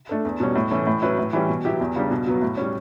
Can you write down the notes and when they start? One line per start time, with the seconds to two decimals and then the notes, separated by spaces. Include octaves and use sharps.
0.09 A3 D4 A4
0.25 E2
0.40 B2 G3 C#4
0.56 A2
0.71 E3 A3 C#4
0.87 A2
1.02 F#3 C#4 E4 B4
1.18 A2
1.33 E3 G3 C#4 G4
1.49 B2
1.65 F#3 B3 E4 G4
1.81 E2
1.96 C#3 G3 D4 G4
2.11 B2
2.27 F#3 B3
2.42 A2
2.57 G3 C#4